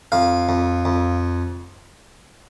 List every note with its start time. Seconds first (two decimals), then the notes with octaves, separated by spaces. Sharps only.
0.12 F2 F5
0.49 F2
0.85 F2